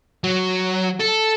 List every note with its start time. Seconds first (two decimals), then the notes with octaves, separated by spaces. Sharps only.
0.24 F#3
1.00 A4